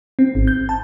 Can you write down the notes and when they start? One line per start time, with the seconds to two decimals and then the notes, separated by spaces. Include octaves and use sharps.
0.19 C4
0.35 G#1
0.47 G6
0.69 A5